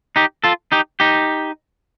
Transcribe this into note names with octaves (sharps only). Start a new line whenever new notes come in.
D#4 G4
F4 A4
D#4 G4
D#4 G4